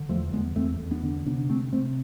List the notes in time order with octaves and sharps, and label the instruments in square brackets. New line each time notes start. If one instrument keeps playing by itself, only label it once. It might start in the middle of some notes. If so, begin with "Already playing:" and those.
Already playing: [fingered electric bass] D3
E2 F3 A3
E2 G#3 B3
E2 A3 C4
E2
B3 D4
D3
C3 B3 D4
C3 A3 C4
C3 A3 C4